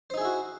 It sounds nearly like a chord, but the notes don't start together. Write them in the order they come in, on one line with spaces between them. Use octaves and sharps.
C5 D#4 G#4 E4 F#4